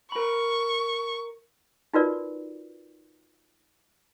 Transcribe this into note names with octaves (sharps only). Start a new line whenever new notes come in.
A#4 B5 C#6
D#4 F4 F#4 A#4 B4 D5